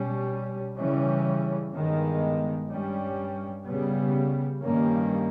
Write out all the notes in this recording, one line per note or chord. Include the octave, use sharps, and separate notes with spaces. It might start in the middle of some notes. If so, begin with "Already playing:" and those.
Already playing: B2 G3 C#4
C#3 E3 G3 C#4
G2 D#3 G#3 B3
G2 G3 C#4
C#3 G3 B3
G2 D#3 G3 A#3 C#4